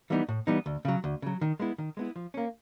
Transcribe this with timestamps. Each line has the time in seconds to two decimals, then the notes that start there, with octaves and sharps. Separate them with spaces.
0.10 E3 G3 B3 D#4
0.29 A2
0.47 E3 G3 B3 D#4
0.66 D2
0.85 C#3 F#3
1.04 D2
1.22 C#3 F#3
1.41 D#3
1.60 G#3 B3 E4
1.78 D#3
1.97 G#3 B3 E4
2.16 F3
2.34 A#3 C#4